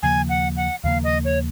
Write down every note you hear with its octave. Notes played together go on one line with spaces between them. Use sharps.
D#2 C#3 F3 A#3 G#5
F#5
F#5
D#2 C#3 F3 A#3 F5
D#5
C#5